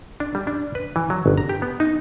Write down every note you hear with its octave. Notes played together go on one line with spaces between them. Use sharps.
D4
G3
D4
B4
E3
F#3
G1
A#5
G4
B3
D#4